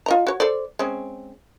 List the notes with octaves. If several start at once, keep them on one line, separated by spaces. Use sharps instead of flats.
F4 D#5 A#5
F#4 C#5
A4 C5 D5
G#3 C4 C#4